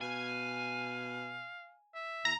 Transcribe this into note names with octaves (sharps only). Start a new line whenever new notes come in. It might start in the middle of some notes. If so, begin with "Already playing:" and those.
B2 F5 G#5
E5
E2 A#5